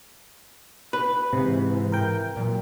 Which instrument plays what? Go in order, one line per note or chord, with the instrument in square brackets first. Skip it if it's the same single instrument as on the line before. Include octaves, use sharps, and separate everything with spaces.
[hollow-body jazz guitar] B4
[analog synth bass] G#2 [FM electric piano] C3 [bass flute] E3
[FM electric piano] A#4 G5
[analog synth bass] A#2 [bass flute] F#3